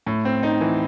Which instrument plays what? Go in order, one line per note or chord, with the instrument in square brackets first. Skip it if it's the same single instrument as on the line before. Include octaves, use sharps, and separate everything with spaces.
[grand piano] A2
C4
D#4
E3